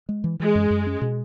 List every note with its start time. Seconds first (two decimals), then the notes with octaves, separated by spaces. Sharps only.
0.09 G#3
0.24 E3
0.40 E3 G#3
0.55 F#2
0.70 F#2
0.87 C#4
1.01 B2